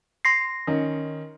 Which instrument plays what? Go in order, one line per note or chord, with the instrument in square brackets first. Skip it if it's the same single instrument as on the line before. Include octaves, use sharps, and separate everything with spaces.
[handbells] C6 A#6 C7
[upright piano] D#3 C#4